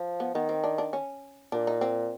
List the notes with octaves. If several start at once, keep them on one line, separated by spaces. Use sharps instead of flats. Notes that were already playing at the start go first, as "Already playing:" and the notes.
Already playing: F3
B3
D#3 B3
C4
D4
D4
C#4
A#2 D4
D#4
C4